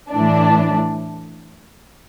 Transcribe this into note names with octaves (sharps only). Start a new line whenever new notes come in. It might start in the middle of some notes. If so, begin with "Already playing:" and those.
A2 E3 D4